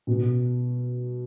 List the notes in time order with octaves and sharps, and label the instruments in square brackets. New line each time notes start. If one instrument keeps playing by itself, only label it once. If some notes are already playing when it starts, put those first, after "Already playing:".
[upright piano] B2